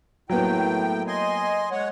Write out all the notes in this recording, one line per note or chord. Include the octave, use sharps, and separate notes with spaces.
A2 F#3 A#3 B3 G5
D#5 G#5 C6
G#3 C#5 F#5